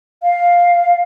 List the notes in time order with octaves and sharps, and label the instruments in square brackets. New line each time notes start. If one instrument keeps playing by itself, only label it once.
[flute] F5